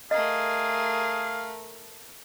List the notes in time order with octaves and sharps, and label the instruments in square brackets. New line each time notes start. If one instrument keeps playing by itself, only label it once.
[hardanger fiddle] A3 A#4 [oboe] G#4 [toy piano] D#5 [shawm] F5